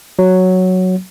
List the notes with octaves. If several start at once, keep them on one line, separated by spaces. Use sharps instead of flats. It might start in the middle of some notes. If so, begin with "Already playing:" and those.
F#3